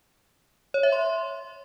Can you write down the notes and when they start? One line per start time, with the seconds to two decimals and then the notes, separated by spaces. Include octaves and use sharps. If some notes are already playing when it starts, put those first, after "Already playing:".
0.74 C#5
0.83 E5
0.92 C6